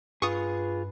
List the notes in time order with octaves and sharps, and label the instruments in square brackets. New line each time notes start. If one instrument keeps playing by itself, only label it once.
[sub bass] G2 [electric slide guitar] F4 G#4 [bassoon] B4 [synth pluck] C#6 D#6